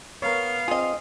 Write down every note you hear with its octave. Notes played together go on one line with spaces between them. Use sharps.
B3 A#4 C#5 F5
C4 F4 G#4 D#5